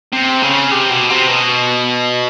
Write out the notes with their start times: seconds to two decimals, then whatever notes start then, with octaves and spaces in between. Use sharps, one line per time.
0.13 C3
0.42 C#3
0.71 C3
0.90 B2
1.10 C3
1.28 B2